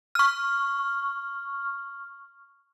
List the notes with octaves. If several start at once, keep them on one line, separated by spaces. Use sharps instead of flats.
C#6 F6